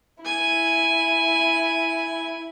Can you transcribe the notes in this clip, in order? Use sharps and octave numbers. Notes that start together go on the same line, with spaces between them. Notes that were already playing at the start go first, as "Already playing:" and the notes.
E4 G#5